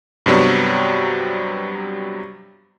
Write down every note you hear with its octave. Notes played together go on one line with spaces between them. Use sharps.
G2 C3 F#3 G3 B3